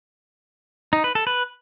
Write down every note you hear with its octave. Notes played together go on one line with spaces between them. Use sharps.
D#4
B4
A4
B4